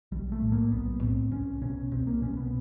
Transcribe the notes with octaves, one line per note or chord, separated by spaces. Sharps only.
B1 G3
A3
A2
A#3
B1 B3
A2 C4
C2 C#4
B2 C#4
C2 C4
A#3
B2 C#4
B3